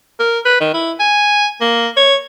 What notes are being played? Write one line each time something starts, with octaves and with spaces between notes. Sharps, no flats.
A#4
B4
D#3
E4
G#5
A#3
C#5